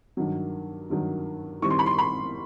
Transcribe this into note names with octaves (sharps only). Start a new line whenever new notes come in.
G2 D#3 F#3
G2 D#3 F#3
D#3 G3 C4 E4 C#6
C6
B5
C6
B5